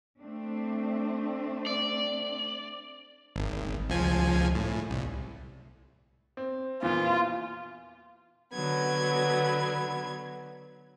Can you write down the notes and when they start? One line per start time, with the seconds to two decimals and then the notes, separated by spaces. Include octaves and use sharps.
0.21 A3 C4 D4
1.67 D5
3.36 G#1
3.90 C#2 F3 G#5
4.55 A2
4.90 C2
6.37 C4
6.83 E2 A#2 F4
8.53 D3 F#3 B3 G#6